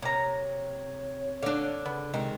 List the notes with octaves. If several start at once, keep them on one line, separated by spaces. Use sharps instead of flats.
C3 A#3 C#5 A#5
D3 D4 F5
C#3 B3
C3 D#3 G#3 C4 D#4